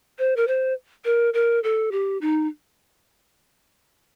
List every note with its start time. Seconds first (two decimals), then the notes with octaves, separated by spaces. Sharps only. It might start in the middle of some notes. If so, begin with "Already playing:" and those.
0.19 C5
0.36 A#4
0.47 C5
1.05 A#4
1.34 A#4
1.64 A4
1.92 G4
2.21 D#4